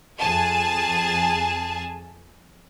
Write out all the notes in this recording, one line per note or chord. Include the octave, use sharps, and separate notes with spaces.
F2 G#4 G#5 A5